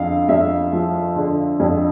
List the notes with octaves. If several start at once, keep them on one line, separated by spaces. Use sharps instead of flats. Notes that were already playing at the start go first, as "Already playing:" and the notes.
Already playing: F2 D3 F5
F2 E5
F3
D3
F2